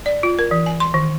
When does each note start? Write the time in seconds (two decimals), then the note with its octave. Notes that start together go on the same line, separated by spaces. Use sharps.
0.06 D5
0.23 F4
0.39 A#4
0.51 E3
0.66 G#5
0.80 C6
0.94 D#3